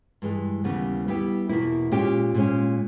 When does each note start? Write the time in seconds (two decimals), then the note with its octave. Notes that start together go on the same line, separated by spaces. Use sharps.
0.22 G2 E3 G#3
0.64 D#2 C#3 E3 G3 B3
1.07 G3 B3 E4 G4
1.49 E2 B2 A#3 E4
1.92 A#2 G#3 C#4 G4
2.35 A#2 G#3 C#4